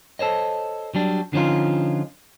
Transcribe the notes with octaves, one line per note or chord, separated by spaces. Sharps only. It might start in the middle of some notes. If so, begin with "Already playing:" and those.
A4 C5 C#5 D#5
F#3 G3 D4
D3 F3 C#4 D#4 F4